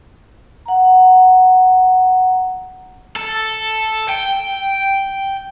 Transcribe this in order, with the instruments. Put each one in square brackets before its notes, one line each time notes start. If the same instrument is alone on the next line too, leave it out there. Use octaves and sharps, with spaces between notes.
[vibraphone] F#5 A#5
[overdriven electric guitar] A4
G5